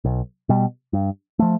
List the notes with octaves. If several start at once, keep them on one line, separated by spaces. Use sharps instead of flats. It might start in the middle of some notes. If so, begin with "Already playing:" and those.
B1
B2 G3
G2
F3 A3